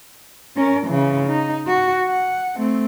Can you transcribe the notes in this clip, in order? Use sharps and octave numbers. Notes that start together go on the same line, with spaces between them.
C#4 A#4
C#3 E3
D#4
F#4
F#5
A3 C4